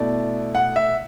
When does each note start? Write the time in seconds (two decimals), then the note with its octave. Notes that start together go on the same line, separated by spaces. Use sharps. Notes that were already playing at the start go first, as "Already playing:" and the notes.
Already playing: B2 A3 E4 D5
0.55 F#5
0.76 E5